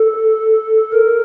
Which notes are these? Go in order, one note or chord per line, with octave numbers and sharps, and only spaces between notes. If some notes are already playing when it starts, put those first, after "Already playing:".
Already playing: A4
A#4